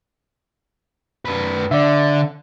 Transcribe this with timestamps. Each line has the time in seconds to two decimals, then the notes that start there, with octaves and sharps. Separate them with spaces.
1.25 F#2 B4
1.71 D3 D5 E5